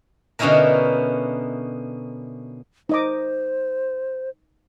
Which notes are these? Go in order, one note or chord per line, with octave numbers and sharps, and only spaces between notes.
B2 D3 C#4 D#4 E4 A#4
D#4 C5 D#5 D6